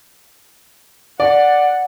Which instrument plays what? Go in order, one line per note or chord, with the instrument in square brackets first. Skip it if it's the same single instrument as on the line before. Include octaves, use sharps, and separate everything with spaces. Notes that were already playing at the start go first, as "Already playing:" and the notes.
[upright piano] D5 [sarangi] F#5